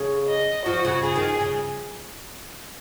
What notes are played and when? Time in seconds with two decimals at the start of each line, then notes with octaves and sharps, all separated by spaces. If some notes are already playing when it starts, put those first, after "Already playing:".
Already playing: C#3
0.28 D#5
0.66 F3 F#4
0.85 C#3
1.03 C#3 G#4
1.16 D#3
1.41 C#3